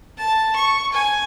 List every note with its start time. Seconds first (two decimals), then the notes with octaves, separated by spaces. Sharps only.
0.17 A5
0.56 C#6
0.92 G#5